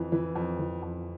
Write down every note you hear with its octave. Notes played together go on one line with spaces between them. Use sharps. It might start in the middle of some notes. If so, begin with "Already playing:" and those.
Already playing: F2 E3
E3
F2
E3
F2